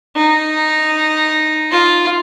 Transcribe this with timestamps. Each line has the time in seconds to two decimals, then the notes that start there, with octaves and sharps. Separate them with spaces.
0.16 D#4
1.72 F4